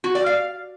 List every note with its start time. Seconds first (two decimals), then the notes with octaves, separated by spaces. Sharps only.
0.04 F#4
0.15 D5
0.26 F5